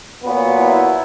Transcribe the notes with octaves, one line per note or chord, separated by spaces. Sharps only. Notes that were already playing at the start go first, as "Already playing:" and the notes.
A#2 F#3 B3
E4